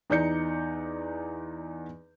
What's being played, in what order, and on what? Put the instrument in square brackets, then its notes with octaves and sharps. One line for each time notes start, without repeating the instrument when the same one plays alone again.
[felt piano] E2 D#4 D5 G6 C#7